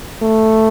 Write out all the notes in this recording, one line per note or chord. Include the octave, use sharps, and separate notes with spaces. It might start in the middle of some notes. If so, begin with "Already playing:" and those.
A3